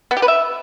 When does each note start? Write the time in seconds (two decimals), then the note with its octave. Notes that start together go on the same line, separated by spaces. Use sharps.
0.11 B3
0.17 G4
0.22 B4
0.28 E5